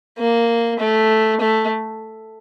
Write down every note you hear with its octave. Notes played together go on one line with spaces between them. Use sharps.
A#3
A3
A3